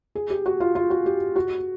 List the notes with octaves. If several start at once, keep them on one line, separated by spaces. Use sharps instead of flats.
G#4
G4
F#4
F4
F4
F#4
G4
F#4